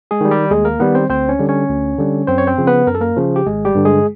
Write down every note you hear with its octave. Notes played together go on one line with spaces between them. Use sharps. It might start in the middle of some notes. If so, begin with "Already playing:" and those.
G#3 G#4
D#3 G3
G3 G4
D#2 G#3 G#4
A#3 A#4
D#3 G3 B3 B4
C4 C5
D2 C4 C5
C#4 C#5
D3 G3
C#4 C#5
D2
D3 G3
F#2 C4 C5
C#5
C4 C5
C#3 F3
B3 B4
F#2 A#4
A4
A#3 A#4
C#3 F3
G4
G#1 G#3 G#4
G3 G4
G2 D3
G#3 G#4